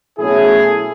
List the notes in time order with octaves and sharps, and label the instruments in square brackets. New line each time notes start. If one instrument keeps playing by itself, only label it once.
[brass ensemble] B2 F#3 A3 C#4 E4 G#4